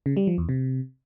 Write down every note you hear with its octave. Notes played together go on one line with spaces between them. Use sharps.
C#3
G3
F3
E2
C3